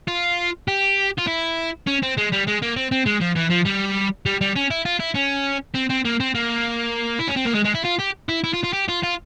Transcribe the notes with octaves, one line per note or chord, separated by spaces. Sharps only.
F4
G4
F4
E4
C#4
C4
G#3
G3
G#3
A#3
C4
C4
G#3
F3
E3
F3
G3
G3
G3
C#4
E4
F4
E4
C#4
C4
C4
A#3
C4
A#3
E4
C#4
C4
A#3
G#3
G#3
E4
F4
G4
E4
E4
F4
F4
G4
F4
F4